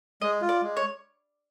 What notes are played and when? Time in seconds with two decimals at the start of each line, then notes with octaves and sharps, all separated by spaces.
0.22 G#3 D#5
0.42 F4
0.49 D5
0.62 G#3
0.77 C#5